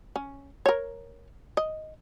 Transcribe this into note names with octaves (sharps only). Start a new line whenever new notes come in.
C#4
A#4 C#5
D#5